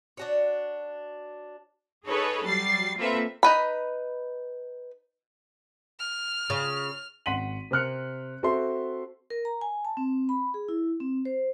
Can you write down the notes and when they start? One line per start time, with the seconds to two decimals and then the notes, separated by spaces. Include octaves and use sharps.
0.17 D4 F#4 C#5
2.07 D#4 G#4 A4 B4 C#5
2.45 F#3 G3 A6 C7
2.98 A#3 C4 F4 A4 B4 E5
3.43 D#4 B4 B5
5.99 F6
6.50 C#3 F4
7.26 G#1 F#5 C6 B6 D#7 F#7
7.71 C3 C4 A#4 F6 F#6 C#7
8.43 C4 F#4 A4 C5 E5 C6
9.30 A#4
9.45 A#5
9.61 G#5
9.85 A5
9.97 C4
10.29 B5
10.54 G#4
10.69 E4
11.00 C4
11.25 C5